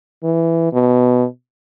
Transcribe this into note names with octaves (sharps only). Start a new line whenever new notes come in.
E3
B2